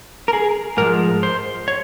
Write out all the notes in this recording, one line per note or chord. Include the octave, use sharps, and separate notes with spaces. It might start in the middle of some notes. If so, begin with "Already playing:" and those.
A#4
G#4
G#2 F3 G#3 A#4
C5
C#5